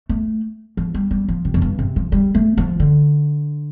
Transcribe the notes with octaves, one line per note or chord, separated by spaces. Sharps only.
A3
F3
G3
G3
F3
C3
F2
G2
C3
F3
G3
A3
F3
D3